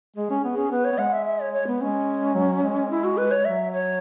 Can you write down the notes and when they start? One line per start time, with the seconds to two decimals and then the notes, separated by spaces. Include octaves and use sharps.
0.16 G#3 G#4
0.30 C#4
0.44 B3
0.53 C#4 G#4
0.71 B3 B4
0.84 C#5
0.92 B3
0.98 G#3 F#5
1.13 E5
1.26 E5
1.40 C#5
1.53 C#5
1.67 B3
1.81 G#3 C#4
2.35 F#3
2.63 G#3
2.90 E4
3.04 F#4
3.17 B4
3.31 C#5
3.44 F#3 E5
3.72 C#5